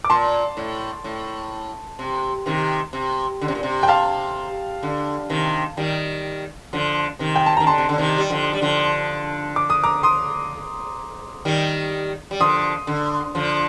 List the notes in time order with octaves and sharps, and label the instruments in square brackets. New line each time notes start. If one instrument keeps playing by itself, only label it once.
[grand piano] D6
[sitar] A#2 [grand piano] A5 C6
[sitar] A2
A2
C3
C3 D#3
C3
D3
C3
A#2
C3
[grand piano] G5
F5 A5
[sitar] D3
C3 D#3
D#3 G3
D3 F3
C3 D#3
[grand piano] G5
A5
[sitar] D#3 [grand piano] A#5
[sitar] D3 [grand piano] A5 C6
[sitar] C3
D3
C3 D#3
G3
D3 F3
G3
D3 F3
[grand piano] D6
D#6
A#5 D6
C6 D#6
[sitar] D#3 G3
G3
[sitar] D3 F3 [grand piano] C6 D#6
[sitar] D3
D3 F3